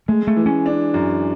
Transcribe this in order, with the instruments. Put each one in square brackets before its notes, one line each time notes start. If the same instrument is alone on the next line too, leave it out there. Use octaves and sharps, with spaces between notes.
[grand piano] G#3 [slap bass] A3
[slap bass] A3
[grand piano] E3
[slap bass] C#4
[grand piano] D4
F#2